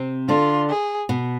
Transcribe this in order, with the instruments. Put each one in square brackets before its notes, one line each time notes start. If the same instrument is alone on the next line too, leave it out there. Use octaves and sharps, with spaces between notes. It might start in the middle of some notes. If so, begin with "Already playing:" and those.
Already playing: [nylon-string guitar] C3 C4
[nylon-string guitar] D3 D4 [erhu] F4
[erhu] G#4
[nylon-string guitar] B2 B3